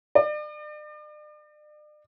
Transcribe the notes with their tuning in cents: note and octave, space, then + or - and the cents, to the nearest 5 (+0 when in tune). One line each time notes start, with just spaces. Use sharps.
D5 +40